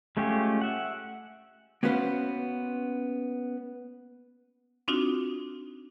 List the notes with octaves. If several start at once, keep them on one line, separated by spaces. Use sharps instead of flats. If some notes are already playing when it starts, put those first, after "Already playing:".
G#3 A3 C#4 F4 G4
E5 F#5
A#3 B3 C#4 F#4 B4 C5
C4 D4 D#4 F4 F#4